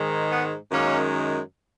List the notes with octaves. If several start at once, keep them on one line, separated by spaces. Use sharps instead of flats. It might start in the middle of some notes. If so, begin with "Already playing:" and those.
Already playing: G#2 D#3 G#3
B3
F#2 D#3 G#3 A#3 C#4